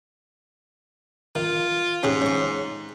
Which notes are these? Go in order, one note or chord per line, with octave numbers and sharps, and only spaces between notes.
D#3 F4
G#2 C#4 G4 G#4
C#4 C#6